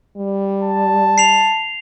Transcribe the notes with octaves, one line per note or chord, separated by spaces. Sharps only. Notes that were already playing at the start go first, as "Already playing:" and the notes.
G3
A5
C7 F7